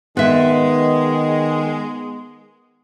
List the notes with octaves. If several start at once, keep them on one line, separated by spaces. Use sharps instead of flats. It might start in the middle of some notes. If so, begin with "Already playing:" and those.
D#3 G#3 B3 B4 E5